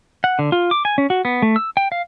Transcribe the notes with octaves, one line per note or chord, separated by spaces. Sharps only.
F#5
D3
F4
D6
G#5
C#4
F#4
B3
A3
E6
G5
F5